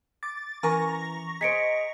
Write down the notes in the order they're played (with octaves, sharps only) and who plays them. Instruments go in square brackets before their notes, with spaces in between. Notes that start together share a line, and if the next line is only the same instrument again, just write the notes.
[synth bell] D6 A6
[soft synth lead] E3 [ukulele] C#4 A#4 G#5 [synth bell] A#5 C#6 A#6
[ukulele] G#4 C5 [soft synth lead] D#5 [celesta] B6 C#7 D7